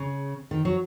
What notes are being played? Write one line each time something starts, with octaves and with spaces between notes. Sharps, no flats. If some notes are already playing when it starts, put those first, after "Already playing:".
Already playing: C#3
D#3
F#3